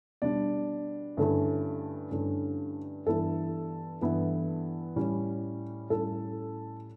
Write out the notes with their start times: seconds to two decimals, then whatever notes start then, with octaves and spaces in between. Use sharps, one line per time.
0.22 B2 G3 D4 D5
1.17 G2 D3 A3 C#4 E4
2.11 G2 D3 A3 C#4 E4
3.06 G2 E3 B3 E4 A4
4.01 G2 E3 B3 E4
4.96 A2 G3 C#4
5.90 A2 G3 C#4 A4